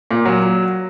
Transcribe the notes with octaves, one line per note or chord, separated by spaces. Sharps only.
A#2
F#3